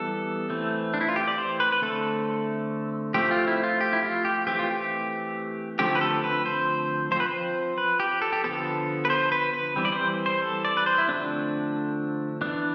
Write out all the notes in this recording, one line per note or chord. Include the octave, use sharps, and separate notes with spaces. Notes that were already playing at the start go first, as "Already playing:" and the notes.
Already playing: E3 G3 B3 A4
E3 A3 C4
D4
E4
F4
G4
D5
C5
B4
B4
D3 A3 C4 A4
F3 A3 C4 G4
F4
E4
F4
G4
E4
F4
G4
E3 A3 C4 G4
F4
G4
D3 F3 A3 C4 G4
B4
A4
B4
C5
F3 C4 B4 C5
C5
B4
G4
A4
G4
D3 F3 B3 A4
B4
C5
B4
B4
E3 G3 C4
D5
C5
C5
A4
D5
B4
C5
E4
D3 F3 A3 C4 D4
E3 B3 D4